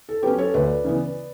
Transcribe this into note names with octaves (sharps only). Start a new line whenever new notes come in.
A4
F#3 C#4 G4 B4
A4 C#5
D2 B4 D5
C#3 E3 B3